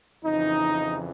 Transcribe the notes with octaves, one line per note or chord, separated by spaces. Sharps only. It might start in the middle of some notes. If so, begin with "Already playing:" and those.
F2 C#3 E3 D#4